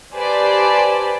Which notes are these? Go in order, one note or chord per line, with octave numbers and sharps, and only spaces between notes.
G4 B4 C5 D5 G#5 A5